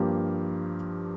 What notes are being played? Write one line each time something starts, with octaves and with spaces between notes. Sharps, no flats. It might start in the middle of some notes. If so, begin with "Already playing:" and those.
Already playing: G2 F3 A#3 G4